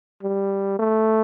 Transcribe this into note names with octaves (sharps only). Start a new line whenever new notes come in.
G3
A3